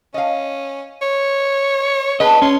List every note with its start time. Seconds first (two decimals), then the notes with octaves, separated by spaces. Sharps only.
0.14 C#4 D#5 F5
1.02 C#5
2.20 B3 D4 G#4 B4 D#5
2.42 C#4 C6